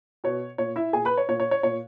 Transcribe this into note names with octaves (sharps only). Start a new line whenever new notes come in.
B2 C#5
A#2 C#5
E4 E5
A#2 G#4 G#5
B4 B5
C#5
A#2 C#5
C#5
C#5
A#2 C#5